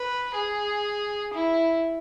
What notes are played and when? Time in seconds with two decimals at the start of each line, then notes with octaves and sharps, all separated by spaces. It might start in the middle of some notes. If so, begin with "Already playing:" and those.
Already playing: B4
0.35 G#4
1.34 E4